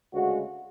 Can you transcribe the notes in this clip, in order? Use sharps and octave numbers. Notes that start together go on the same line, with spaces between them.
D2 C#3 G#3 F#4